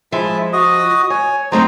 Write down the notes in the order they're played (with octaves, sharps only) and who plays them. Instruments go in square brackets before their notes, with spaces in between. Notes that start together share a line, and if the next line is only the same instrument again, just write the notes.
[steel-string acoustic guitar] F3 [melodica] G#3 E4 E5
[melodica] F#4 D#5 D#6
[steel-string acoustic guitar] C#5 [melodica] G#5
[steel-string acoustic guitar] F#3 A3 C4 [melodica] D#4 C5 A#5